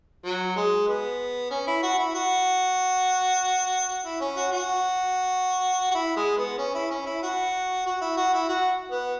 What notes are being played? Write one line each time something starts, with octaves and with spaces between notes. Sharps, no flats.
F#3
G#3
B3
C#4
E4
F#4
E4
F#4
E4
C#4
F#4
F#4
F#4
E4
G#3
B3
C#4
E4
C#4
E4
F#4
F#4
E4
F#4
E4
F#4
B3